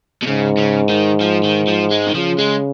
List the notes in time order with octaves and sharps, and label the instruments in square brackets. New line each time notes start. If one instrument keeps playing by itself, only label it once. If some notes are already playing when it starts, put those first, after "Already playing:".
[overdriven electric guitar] B2
[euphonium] G#2 [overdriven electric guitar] C#3
[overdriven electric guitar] C#3
D#3
F3
D#3
F3
G#3
D#3
[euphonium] C#3 [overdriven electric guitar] F3
[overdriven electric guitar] G#3